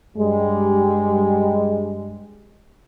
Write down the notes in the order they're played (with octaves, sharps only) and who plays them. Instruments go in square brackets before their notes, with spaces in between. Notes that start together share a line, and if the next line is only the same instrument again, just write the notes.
[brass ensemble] G2 G3 G#3